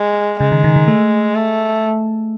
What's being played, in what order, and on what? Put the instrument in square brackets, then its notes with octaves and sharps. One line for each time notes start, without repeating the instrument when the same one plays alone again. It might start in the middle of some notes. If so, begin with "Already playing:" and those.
Already playing: [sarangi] G#3
[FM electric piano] C#3 [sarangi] G#3
[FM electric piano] D#3
D#3
D#3
A3
[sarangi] A3